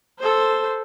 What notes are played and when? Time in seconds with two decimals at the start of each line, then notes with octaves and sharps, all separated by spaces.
0.19 A4 C5